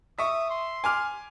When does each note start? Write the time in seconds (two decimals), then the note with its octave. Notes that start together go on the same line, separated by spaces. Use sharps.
0.18 E5 C#6 D#6
0.50 C6
0.84 G#5 D6 F6